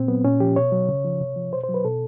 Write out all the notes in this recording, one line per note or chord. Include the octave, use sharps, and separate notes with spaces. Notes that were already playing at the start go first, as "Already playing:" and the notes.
Already playing: A#2 C4
F#3 B3
A#2 C#4
F3 G4
B2 C#5
F#3
C#3
F3
C3
F3
B2 C5
C5
F#3
B4
B2 A4